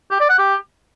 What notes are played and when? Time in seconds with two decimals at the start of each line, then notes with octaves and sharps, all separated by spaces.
0.11 G4
0.20 D5
0.29 F#5
0.39 G4